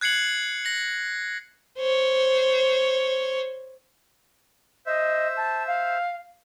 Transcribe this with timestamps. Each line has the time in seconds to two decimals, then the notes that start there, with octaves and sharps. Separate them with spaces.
0.01 F#6 G#6 C7 C#7 F#7
0.65 A#6 F#7
1.79 C5 C#5
4.86 C5 D#5 E5
5.37 A5
5.67 F5